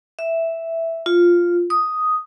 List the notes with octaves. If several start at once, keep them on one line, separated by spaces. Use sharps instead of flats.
E5
F4
D#6